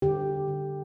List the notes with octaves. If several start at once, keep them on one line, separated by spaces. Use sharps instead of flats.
D3 G4
D3